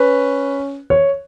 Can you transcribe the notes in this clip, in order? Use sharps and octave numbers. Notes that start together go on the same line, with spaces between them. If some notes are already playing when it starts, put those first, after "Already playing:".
Already playing: C#4 B4
C#5